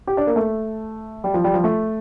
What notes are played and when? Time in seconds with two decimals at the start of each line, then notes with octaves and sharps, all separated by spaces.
0.07 G4
0.17 D4
0.27 A#3
0.36 A3
1.24 G3
1.34 F3
1.44 G3
1.54 F3
1.64 A3